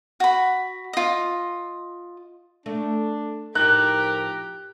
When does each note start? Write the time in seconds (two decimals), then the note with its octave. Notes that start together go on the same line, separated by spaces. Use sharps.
0.20 F#4 B5
0.93 F4 D#5
2.66 A3 D4
3.55 A2 F3 D#4 G4 A#4 F#6